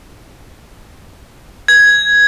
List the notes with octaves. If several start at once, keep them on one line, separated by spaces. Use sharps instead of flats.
G#6